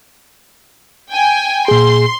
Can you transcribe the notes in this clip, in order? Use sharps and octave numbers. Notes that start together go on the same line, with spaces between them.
G5 G#5
A#2 G#4 C6